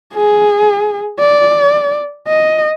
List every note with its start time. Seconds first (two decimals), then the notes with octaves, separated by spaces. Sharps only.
0.14 G#4
1.20 D5
2.28 D#5